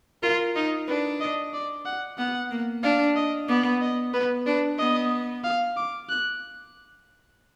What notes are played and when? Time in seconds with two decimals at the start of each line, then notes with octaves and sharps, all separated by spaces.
0.22 F4 A#4
0.56 D#4
0.88 D4 B4
1.20 D#5
1.53 D5
1.85 F#5
2.18 B3 F#5
2.51 A#3
2.83 D4 F5
3.16 D#5
3.48 B3 D5
3.81 D#5
4.13 B3 B4
4.46 D4 B4
4.78 B3 D#5
5.44 F5
5.77 D6
6.09 F#6